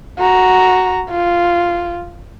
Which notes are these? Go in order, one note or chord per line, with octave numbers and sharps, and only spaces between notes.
F#4 A#5
F4